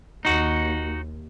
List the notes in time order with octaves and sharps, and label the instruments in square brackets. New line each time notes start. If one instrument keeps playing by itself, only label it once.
[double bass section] D#2 [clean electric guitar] D#4 F#4